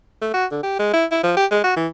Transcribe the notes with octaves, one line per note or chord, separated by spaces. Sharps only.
A3
F#4
D3
G4
G#3
E4
E4
F3
G4
G#3
F#4
E3